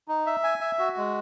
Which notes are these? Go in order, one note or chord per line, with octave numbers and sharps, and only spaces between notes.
D#4
E5
G#5
E5
F#4
G#3